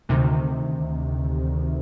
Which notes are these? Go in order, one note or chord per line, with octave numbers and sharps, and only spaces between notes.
D2 C3 D#3